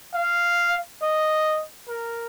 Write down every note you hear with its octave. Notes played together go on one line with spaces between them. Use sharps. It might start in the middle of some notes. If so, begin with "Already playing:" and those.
F5
D#5
A#4